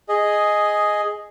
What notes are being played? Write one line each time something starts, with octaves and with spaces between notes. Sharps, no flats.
G#4 D#5